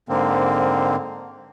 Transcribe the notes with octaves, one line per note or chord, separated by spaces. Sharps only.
G#2 D3 A#3 C4